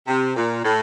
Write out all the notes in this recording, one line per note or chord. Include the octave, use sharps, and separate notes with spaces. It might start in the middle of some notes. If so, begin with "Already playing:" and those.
C3
A#2
A2